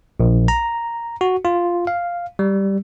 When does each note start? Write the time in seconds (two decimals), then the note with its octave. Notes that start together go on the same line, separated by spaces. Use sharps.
0.20 A#1
0.48 A#5
1.21 F#4
1.45 F4
1.87 F5
2.39 G3